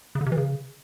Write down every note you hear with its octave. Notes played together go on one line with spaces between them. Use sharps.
C#3
D3
C3
E3
C#3